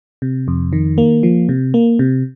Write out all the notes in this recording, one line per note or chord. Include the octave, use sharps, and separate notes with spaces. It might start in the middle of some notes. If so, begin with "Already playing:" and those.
C3
F2
D#3
A#3
F3
C3
A#3
C3